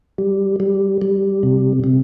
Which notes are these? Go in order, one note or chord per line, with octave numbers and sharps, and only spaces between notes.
G3
G3
G3
C3
C3